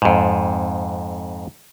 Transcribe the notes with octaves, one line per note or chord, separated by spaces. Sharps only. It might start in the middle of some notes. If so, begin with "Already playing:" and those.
F2 G#2